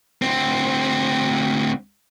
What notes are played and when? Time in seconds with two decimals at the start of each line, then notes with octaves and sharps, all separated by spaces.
0.22 D2 C4